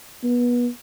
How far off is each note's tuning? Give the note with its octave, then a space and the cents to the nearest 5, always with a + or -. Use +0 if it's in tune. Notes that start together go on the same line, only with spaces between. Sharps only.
B3 -25